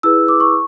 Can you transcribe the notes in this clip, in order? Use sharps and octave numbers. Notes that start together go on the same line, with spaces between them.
E4 G#4 B4 E6
D6
C#6